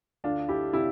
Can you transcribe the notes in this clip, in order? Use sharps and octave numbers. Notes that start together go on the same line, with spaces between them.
D2 D4 F4
D2 E4 G4
C3 E4 G4